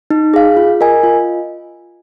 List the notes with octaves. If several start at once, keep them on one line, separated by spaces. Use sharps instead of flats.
D#4
G#4 F5
F4
A#4 D#5 G#5
F4